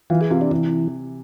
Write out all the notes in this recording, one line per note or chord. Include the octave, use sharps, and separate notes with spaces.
E3 F4
G#4
C3 F4
D4
C3 E3